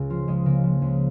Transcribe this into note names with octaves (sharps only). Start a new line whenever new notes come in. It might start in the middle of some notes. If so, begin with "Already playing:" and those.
Already playing: C#2 C#3
F3 F4
C#2 G#3
C#3 A#3
F3
C#2